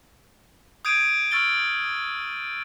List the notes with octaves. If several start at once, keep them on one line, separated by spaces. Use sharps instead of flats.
D#6 G6 G#6 D7 D#7
C#6 E6 F6 A6 D7 G7